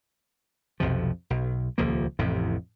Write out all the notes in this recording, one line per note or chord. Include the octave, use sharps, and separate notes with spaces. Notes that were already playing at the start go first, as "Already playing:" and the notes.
B1 F2 C3 F3
B1
D#1 C#2 F3 A#3
A1 F2 A2 C3